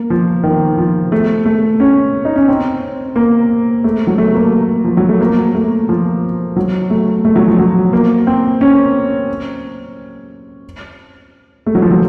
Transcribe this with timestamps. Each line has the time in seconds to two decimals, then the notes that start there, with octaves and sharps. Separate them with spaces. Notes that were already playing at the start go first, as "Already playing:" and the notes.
Already playing: A#3
0.10 F3
0.44 D#3
0.78 F3
1.12 A3
1.46 A3
1.80 C#4
2.25 D#4
2.36 C#4
2.48 C4
3.16 A#3
3.84 A3
4.07 F#3
4.18 A3
4.35 A#3
4.84 F3
4.97 F#3
5.09 A3
5.21 A#3
5.55 A3
5.89 F3
6.56 F#3
6.90 A3
7.25 A3
7.36 F#3
7.48 F3
7.59 F#3
7.93 A#3
8.27 C4
8.61 C#4
11.66 A3
11.75 F#3
11.82 F3
11.91 F#3